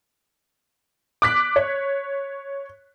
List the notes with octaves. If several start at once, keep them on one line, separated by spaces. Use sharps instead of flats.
D6 F#6 B6
C#5